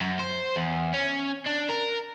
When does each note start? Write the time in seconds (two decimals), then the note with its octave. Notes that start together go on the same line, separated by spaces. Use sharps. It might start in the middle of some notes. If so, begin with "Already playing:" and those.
0.01 F#2
0.19 C5
0.56 E2
0.93 C#4
1.47 D4
1.70 A#4